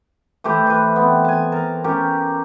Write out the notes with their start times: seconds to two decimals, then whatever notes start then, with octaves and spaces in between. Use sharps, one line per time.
0.44 E3 A3 G4 C5
0.67 E3 B4
0.96 B3 C4
1.25 G#5 A5
1.52 A#4 A5 A#5
1.84 C#4 G4 A#4